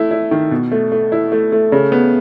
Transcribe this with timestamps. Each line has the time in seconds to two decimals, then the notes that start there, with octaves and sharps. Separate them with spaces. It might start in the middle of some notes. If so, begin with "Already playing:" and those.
Already playing: A3 E4
0.11 E4
0.31 D#3
0.51 B2
0.72 A3
0.92 A3
1.12 E4
1.32 A3
1.52 A3
1.72 C#3
1.92 B3